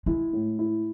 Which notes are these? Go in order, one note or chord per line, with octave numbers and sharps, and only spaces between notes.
G#3 E4
A2
E4